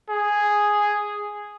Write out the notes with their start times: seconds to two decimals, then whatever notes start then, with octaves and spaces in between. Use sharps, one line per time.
0.09 G#4